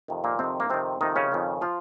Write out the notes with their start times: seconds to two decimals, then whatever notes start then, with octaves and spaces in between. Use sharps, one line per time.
0.08 F2 C3 D#3
0.24 A#2 A#3
0.39 F2 C3 D#3 C4
0.60 A#3
0.70 F2 C3 D#3 C4
1.01 F2 C3 D#3 D#4
1.16 C#3 C#4
1.32 F2 D#3
1.61 F3 F4